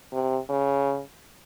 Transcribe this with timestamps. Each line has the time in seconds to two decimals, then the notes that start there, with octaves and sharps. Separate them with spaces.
0.13 C3
0.50 C#3